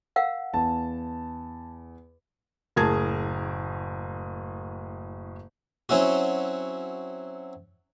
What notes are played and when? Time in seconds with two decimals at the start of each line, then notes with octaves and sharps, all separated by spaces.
0.16 A#4 F5 F#5
0.54 E2 A5
2.76 F#1 A2 G#4 A#4 A5 G#6
5.89 F#3 C4 C#4 E4 F#4